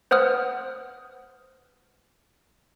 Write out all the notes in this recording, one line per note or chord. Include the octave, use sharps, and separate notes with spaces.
B4 C5 F#5 D#6 F6